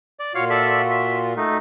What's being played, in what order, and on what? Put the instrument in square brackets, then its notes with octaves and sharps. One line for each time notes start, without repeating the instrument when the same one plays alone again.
[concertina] D5
[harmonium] A#2 F4 F#4 [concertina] C#5 F5
[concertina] A4 D5 E5
E5
A3 D#4